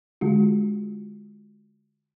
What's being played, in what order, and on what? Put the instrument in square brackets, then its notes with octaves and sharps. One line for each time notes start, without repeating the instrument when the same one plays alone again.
[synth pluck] D3 G#3 F4 F#4